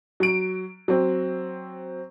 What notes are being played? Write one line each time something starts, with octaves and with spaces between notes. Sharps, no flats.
F#3 D7
F#3 C4